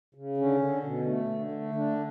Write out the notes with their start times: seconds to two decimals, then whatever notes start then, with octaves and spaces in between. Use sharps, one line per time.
0.14 C#3
0.37 D3 C#4
0.60 D3
0.83 B2
1.07 A3
1.29 D3
1.51 A3
1.75 D3 D4